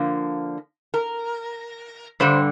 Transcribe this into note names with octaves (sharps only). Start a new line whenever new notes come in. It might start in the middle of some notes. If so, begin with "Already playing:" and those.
Already playing: D3 F3 A#3
A#4
G2 D3 G3 C5